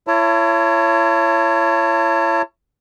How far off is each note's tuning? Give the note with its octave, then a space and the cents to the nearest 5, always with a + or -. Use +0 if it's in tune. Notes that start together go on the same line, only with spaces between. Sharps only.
E4 +35 C#5 +0 A5 +35